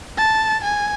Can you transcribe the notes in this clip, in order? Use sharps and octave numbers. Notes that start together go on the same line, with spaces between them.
A5
G#5